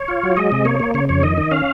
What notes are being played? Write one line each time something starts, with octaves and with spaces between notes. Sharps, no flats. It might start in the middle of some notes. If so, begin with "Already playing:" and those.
Already playing: C#5
F4
F#3
G#3 D#5
C3
A#3 C#5
A#3
C#3 C#5
F2 C#5
D#3 D#5
D#3
C#4 F5